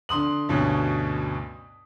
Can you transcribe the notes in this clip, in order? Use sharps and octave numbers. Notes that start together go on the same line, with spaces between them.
D3 C6 D#6 F#7
D2 G2 B2 C#4